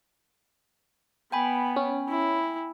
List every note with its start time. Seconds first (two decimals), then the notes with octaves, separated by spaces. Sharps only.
1.32 B3 G5 G#5 B5
1.76 C#4
2.09 E4